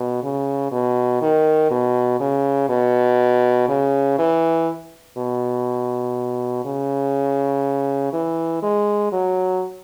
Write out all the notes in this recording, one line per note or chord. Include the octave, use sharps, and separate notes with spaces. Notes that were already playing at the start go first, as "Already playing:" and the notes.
Already playing: B2
C#3
B2
D#3
B2
C#3
B2
C#3
E3
B2
C#3
E3
G#3
F#3